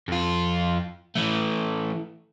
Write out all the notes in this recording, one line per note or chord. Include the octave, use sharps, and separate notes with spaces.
F2 F4
E3 A3